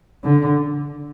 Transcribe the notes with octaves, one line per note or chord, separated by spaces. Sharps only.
D3